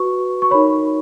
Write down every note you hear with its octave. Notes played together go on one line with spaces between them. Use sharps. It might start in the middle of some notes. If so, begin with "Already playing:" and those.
Already playing: F#4 B4 C#6
C#6
D#4 A#4 C#5 B5